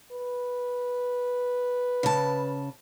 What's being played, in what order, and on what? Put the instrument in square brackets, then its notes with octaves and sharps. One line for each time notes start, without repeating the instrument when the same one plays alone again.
[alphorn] B4
[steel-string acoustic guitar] C#3 A5